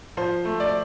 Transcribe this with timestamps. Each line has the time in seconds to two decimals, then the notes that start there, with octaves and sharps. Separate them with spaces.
0.17 F3 C5
0.45 A3
0.60 D5